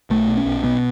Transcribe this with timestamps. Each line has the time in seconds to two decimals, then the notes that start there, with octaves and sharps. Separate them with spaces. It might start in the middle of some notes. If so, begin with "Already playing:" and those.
0.10 B1 A3
0.28 B2
0.37 C#4
0.46 B1
0.63 B2 B3